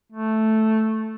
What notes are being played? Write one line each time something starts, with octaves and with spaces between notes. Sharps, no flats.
A3